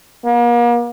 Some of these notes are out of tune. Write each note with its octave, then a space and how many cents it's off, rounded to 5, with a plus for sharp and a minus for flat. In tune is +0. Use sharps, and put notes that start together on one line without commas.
A#3 +40